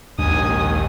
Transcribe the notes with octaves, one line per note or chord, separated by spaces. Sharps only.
A#1 D#2 G#2 D4 G#5 D#6